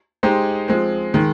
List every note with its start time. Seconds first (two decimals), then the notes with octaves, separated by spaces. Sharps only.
0.23 G#3 D#4 G4 C5
0.68 F3 G#3 C4
1.14 D#3 G#3